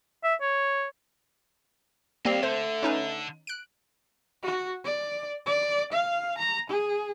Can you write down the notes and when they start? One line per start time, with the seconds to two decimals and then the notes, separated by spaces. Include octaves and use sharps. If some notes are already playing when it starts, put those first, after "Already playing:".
0.24 E5
0.41 C#5
2.25 G3 A#3 C4 D#5 F5
2.43 D3 A3 C5
2.83 C#4 D#4 B4
3.47 F#6 D7
4.43 F#4
4.85 D5
5.46 D5
5.92 F5
6.38 A#5
6.70 G#4